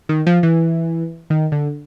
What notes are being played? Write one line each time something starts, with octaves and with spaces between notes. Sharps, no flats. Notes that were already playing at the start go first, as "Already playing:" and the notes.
D#3
F3
E3
D#3
D3